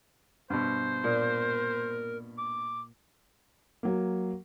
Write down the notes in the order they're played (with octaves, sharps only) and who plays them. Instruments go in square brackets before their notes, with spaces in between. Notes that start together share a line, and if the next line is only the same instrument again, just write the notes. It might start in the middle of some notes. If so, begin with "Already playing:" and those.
[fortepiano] G2 B2 [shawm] C5
[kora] A#2 [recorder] A#4
[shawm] D6
[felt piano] F#3 A#3